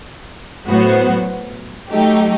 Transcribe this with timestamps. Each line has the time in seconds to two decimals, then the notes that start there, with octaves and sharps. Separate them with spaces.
0.68 A2 F#3 B3 F#4 C5
1.91 F#3 A3 D#4 G4